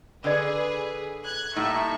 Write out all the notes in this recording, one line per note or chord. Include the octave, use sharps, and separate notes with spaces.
D3 G#4 B4 D5 D#6
F#6 G#6
A2 G3 A#3 D#4 E5 C#6